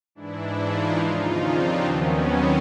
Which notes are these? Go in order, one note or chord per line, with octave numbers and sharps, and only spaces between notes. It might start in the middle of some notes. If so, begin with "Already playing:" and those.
G#2 E3 D4 E4
D#4 F4
D#2 C#3 F3 D#4 F4
C4 D4
D#2 D#3 F#3 B3 C#4
C4